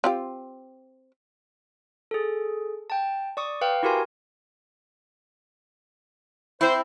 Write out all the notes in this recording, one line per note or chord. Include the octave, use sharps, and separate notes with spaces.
C4 F4 G4
G#4 A4
G5 A5
D5 C#6 D#6
B4 F5 G5
E4 F#4 G4 A#4 G#5 C6
C4 E4 C5